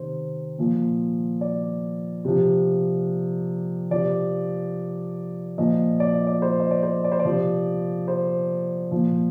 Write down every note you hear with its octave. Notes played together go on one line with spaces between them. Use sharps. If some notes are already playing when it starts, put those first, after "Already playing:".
Already playing: C3 D#3 C5
A#2 F3
D5
C3 F3
C3 F3 D5
A#2 F3 D#5
D5
D#5
D5
C5
D#5
D5
C5
D5
C5
D5
C3 F3
C5
A#2 F3